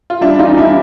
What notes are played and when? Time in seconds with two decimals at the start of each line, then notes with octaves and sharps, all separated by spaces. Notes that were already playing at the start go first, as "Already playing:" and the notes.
0.10 F4
0.21 G3 D4 E4
0.39 E2 D#4 F4
0.57 G3 D4 E4